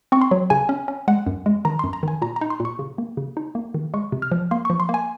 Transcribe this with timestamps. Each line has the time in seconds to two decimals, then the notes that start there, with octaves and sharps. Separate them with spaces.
0.12 C4 C#6
0.21 C6
0.31 F#3
0.50 C#3 G#5
0.69 C#4
0.88 C#4
1.08 G#3 F#5
1.27 F#2
1.46 G#3
1.65 D#3 A#5
1.79 C6
1.84 F#2
1.93 A#5
2.03 D#3 G#5
2.22 A#2 A#5
2.36 A#5
2.41 D#4
2.50 C6
2.60 A#2
2.65 C#6
2.79 C#3
2.98 A#3
3.17 C#3
3.37 D#4
3.55 A#3
3.74 D#3
3.94 G#3 C#6
4.12 C3
4.22 F6
4.32 F3
4.51 A#3 C6
4.65 C#6
4.70 F3
4.80 C6
4.89 A#3
4.94 G#5